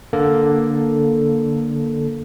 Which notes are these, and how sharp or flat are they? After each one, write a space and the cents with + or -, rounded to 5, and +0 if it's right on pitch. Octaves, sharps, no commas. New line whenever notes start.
D3 +0 A#3 +5 A4 +0